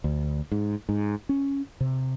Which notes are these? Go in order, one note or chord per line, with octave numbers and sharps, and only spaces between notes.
D2
G#2
G#2
C#4
C3